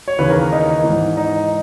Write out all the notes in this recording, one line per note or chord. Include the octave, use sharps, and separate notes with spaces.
C#5
D#2 C#3 E3 B4
A#4
A#4
D#4
G#2 E3
D#4